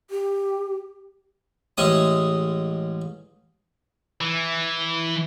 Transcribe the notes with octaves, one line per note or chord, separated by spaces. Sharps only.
G4
A1 G#3 C#4 D#6
E3